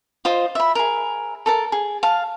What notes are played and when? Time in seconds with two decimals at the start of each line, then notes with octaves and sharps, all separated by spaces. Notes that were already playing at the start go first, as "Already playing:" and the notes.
0.25 F4 C5 D#5
0.55 E5 B5
0.75 G#4 A#4
1.46 A4 A#4 A5
1.72 G#4
2.03 F5 A5